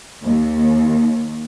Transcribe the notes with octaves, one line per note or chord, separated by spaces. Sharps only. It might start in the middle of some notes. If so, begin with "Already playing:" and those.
D#2